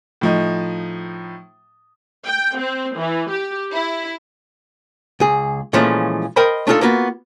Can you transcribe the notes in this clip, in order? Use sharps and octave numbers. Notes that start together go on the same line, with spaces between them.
A2 F3 D#4
G5
C4
E3
G4
E4
C#2 G#4
A#2 E3 F3 G#3 A3 C#4
A#4 C5 D#5 G5 A5 B5
A3 D4 D#4 F4 G#4 A4
A#3 B3 F4 F#4 B5